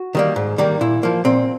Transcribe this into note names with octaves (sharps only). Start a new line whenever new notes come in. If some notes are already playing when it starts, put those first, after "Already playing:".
Already playing: F#4
D#3 G3 A#3
G#2
D#3 G3 A#3
A#2 E4
F3 A#3
A#2 C4